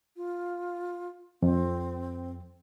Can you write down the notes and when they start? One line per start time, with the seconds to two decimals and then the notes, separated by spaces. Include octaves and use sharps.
0.17 F4
1.42 F2 C4